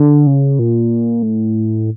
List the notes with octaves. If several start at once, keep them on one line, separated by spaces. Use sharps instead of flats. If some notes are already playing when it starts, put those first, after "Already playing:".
Already playing: D3
C#3
A#2
A2